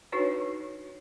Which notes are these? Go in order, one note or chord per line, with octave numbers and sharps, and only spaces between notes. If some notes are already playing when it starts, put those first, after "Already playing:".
D4 D#4 F#4 B4 C#5